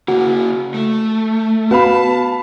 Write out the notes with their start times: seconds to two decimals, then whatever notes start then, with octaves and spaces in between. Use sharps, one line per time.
0.08 C#3 A#3 F#4
0.74 A3
1.71 B3 F#4 B4 F5 A5 B5